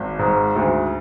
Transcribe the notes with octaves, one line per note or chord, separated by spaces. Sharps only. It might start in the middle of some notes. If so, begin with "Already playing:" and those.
Already playing: G#1
G#2
D2